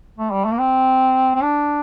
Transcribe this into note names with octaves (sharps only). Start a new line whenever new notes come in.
A3
G3
A3
A#3
C4
C4
D4